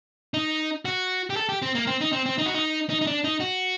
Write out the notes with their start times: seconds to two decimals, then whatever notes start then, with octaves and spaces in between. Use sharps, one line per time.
0.34 D#4
0.85 F#4
1.30 G4
1.36 A4
1.49 G4
1.62 C4
1.75 A#3
1.87 C4
2.01 D#4
2.13 C4
2.26 C4
2.38 D#4
2.46 F#4
2.54 D#4
2.90 D#4
3.01 D#4
3.07 D4
3.24 D#4
3.40 F#4